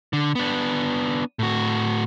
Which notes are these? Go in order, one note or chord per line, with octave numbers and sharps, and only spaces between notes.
D3
B3 D4
A2 F#4